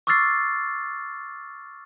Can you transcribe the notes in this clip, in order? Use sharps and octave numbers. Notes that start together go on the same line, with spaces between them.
C#6 D6 E6 F6 A6 C7